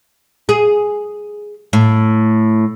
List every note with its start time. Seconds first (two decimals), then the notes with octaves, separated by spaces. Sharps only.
0.49 G#4
1.73 A2